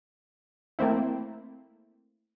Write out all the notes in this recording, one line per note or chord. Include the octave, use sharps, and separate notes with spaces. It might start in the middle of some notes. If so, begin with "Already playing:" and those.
A3 A#3 C4 E4